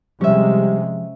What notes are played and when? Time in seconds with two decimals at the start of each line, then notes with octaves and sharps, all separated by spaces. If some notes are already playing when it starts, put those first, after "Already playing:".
0.21 C3 F3 G3 G#3 C#4 E5